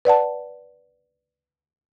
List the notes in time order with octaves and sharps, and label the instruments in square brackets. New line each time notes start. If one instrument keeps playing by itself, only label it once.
[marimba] B4 D5 F#5 A5